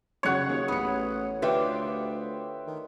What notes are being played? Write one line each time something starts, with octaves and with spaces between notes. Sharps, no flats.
C#3 F#3 C#5 F#5 C#6
D#2 G#4
A1 B3 D#6 C#7
D2 D3 F4 G4 B4 E5 G5
D#3